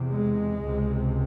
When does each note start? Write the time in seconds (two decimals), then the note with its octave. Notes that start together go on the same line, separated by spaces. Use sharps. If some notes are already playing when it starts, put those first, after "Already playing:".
Already playing: E2 C3
0.11 G#3
0.64 C#2 C3